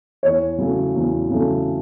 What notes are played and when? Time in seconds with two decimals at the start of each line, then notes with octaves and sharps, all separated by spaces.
0.23 E2 C#5
0.59 C#3 F#3 A3
0.94 E2
1.30 C#3 F#3 A3